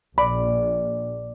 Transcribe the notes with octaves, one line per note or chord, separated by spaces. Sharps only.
A#1 D5 B5